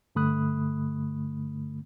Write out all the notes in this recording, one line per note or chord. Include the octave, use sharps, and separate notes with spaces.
G2 D3 A3 B5 D#6 F#6